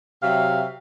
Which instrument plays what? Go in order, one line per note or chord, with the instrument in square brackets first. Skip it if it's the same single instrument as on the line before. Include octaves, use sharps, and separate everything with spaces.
[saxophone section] C3 F#3 E5 F5